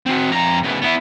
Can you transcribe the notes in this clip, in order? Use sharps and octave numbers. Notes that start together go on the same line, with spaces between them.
C4 F#4
F2 A#5
C#3 B3
B3 E4